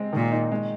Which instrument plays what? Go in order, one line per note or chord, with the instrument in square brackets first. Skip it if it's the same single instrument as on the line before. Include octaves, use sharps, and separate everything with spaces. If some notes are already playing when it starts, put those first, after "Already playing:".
Already playing: [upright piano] G#3 C4
[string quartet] A#2 [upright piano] D#3
[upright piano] D#4
G#3